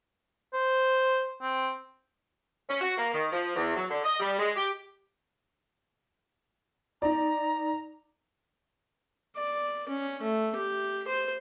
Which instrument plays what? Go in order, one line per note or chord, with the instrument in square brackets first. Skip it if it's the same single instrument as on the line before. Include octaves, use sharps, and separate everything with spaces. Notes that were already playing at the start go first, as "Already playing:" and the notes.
[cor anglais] C5
C4
[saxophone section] C#4
F#4
A#3
D#3
F3
E2
F#3
D3
D#5
G3
G#3
G4
[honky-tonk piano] D#4 D5 [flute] A#5
[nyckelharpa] D5
C#4
A3
G4
C5